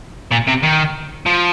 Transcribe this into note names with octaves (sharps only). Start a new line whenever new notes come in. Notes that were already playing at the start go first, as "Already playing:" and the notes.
A#2
C3
D#3
F3